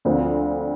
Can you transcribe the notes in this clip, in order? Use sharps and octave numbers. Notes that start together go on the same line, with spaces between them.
D2 D3 F3 C4